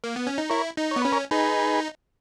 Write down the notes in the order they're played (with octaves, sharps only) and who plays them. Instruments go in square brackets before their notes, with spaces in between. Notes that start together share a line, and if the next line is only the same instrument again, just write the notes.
[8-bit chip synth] A#3
B3
C#4
D#4
[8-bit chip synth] E4 [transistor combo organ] A#4 C#5
[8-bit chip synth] D#4
[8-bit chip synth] B3 [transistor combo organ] C#5
[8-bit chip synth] C#4 [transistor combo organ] B4
[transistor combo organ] A#4 C#5
[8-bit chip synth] D#4 [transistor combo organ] G#4 B4